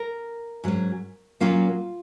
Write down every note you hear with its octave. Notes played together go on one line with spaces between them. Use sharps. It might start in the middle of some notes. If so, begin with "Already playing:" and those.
Already playing: A#4
G#2 F#3 C#4
A#2 F#3 A#3 C#4 F4